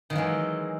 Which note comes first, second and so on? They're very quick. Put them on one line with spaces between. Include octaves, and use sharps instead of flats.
D#3 F#3 E3 G#3